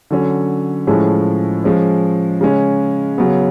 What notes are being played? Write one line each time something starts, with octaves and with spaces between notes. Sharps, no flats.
D3 F#3 C#4
A2 F3 G#3 C#4
F3 G#3 C#4
C#3 G#3 C#4
C#3 F#3 B3